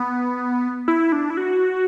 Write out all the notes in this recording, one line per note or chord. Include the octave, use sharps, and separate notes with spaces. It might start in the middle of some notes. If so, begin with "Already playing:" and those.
Already playing: B3
E4
D4
E4
F#4